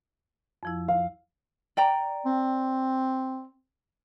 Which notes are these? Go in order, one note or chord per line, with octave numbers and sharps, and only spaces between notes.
F2 F3 E4
F5
D5 G5 A#5
C4